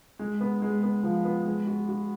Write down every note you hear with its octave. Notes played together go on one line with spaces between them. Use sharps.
G#3
B3
G#3
B3
F3
B3
G#3
F#4
F#4